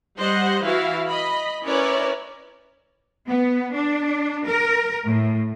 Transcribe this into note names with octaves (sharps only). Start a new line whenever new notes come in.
G3 C5 D#5 F#5
E3 E4 F#4 F5
D#5 B5
C#4 E4 A#4 B4 C#5 D5
B3
D4
A#4
A2